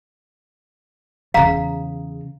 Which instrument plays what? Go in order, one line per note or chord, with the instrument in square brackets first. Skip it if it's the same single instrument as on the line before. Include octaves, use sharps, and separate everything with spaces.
[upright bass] E2 C#3 [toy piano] F5 A#5